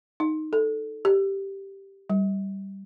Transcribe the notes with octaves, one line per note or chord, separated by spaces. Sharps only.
D#4
A4
G4
G3